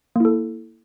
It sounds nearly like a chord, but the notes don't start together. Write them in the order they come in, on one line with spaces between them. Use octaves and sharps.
A#3 E4 A4